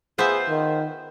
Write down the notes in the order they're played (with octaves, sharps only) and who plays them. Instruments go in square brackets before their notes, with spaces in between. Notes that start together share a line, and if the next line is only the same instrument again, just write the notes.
[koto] B3 E5 [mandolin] F4 C5 [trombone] G#4
[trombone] D#3